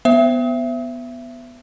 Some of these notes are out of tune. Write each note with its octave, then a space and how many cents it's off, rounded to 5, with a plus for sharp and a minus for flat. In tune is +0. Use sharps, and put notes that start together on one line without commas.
B3 +0 C5 +0 E5 +25